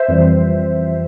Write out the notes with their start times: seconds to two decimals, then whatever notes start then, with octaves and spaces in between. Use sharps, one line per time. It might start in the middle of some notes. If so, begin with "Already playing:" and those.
Already playing: C5 E5
0.08 F2 E3 G3